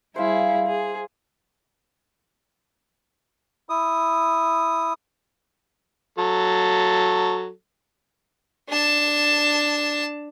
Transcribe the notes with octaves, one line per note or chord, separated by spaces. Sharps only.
G3 E4 G#4 C5 F5
G#4
E4 D#6
F#3 A4
D4 A5